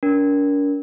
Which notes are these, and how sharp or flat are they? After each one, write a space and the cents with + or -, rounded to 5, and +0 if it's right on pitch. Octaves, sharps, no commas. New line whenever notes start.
D4 -45 A#4 +15